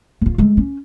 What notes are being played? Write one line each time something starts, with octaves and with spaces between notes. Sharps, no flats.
D1 F4
G#3 A3
C#4